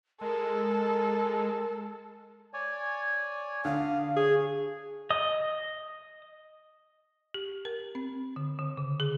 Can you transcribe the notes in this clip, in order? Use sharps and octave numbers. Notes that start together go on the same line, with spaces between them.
G#3 A4 A#4
C#5 D5 G#5
D3 F5 D#6 F6
G#4 C#5
D#5 D#6
G4
A#4
C4
D3
D3
C#3
G#4